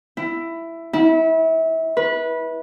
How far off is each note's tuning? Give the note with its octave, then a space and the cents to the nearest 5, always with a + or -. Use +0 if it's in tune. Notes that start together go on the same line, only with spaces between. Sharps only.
E4 +10
E4 -30
B4 -20